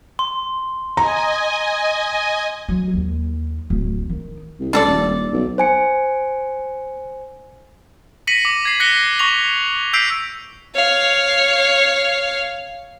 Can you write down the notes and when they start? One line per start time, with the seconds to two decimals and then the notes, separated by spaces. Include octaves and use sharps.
0.19 C6
0.97 D#5 G#5 A#5
2.69 F#3
2.94 D#2
3.70 D1
4.10 D#3
4.60 C2
4.73 C#2 D4 A4 D5
4.87 D#1
5.33 B1
5.58 C5 G#5 C#7
8.27 A#6 B6 C#7 D#7 F#7
8.45 D6
8.65 G#6 C7
8.80 F#6 A#6 B6 C#7 G7
9.19 C#6 A#6 F7
9.93 E6 G6 B6 C7 D7 F7
10.75 C#5 F5